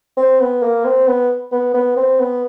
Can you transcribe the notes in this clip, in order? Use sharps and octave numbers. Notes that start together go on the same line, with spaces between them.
C4
B3
A#3
C4
B3
B3
B3
C4
B3